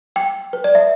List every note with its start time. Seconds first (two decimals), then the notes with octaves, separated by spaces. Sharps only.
0.16 G5
0.53 B4
0.64 D5
0.75 E5